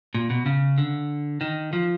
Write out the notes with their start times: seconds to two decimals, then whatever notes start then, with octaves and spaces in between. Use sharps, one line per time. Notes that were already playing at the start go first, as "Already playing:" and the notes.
0.14 A#2
0.30 B2
0.46 C#3
0.78 D3
1.41 D#3
1.73 F3